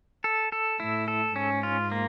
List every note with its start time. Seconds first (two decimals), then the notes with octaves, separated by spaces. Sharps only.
0.24 A4
0.52 A4
0.80 A2 E4
1.08 A4
1.36 G#2 C#4
1.63 F4
1.92 A#3